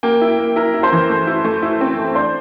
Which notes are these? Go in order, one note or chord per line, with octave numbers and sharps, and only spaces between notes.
A#3 G5
E4
A#3
E4 A#4
E4
C5
E3
A3
E4
A3
E4
C4
A3
D4 C5